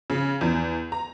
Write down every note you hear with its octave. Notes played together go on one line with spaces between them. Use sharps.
C#3
E2
A#5